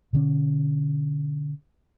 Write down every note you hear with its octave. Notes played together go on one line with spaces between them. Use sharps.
B2 D3 C#4